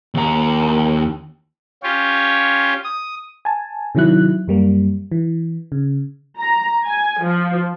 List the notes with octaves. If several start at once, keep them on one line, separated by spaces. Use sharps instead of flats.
D#2 A#5
C#4 F4 G4 C#5
D#6
G#5 A5
C3 D#3 F#3 E4 F#6
F#2 G3 A#3
E3
C#3
A#5
G#5
F3